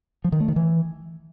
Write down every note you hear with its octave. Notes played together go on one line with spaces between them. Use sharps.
F3
D#3
A3
D#3
E3